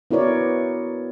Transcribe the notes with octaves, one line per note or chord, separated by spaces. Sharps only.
B3 E4 F#4 A#4 C#5 D5